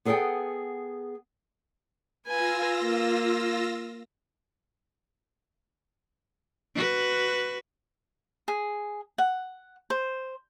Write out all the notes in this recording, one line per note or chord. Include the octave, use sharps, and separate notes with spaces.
B3 G#4 A4 C#5 F#5 G5
F4 B4 G#5 E6 A#6
A#3
F#4 B4
G#4
F#5
C5